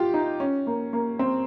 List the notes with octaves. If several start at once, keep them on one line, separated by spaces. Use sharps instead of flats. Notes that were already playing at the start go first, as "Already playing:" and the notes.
Already playing: F4 G4
D#4
C#4
A#3
A#3
C4